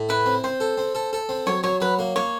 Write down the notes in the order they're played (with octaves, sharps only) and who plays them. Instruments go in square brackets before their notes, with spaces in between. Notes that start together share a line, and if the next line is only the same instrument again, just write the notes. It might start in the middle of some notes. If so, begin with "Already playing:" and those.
Already playing: [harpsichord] A2
[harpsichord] E4 [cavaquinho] B4
[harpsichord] C4
[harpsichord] C4 [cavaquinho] C5
[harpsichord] A4
C4
A4
A4
C4
[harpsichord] F#3 [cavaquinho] C#5
[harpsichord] F#3 [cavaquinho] C#5
[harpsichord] F#3 [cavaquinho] B4
[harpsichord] A#3
[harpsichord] A#3 [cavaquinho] C#5